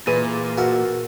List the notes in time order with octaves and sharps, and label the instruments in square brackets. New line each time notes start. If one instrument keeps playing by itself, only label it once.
[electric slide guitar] A#2 [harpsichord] E3 [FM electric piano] G#4 B4 [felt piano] D#7
[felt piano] F#4 [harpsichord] A#4 E5 A5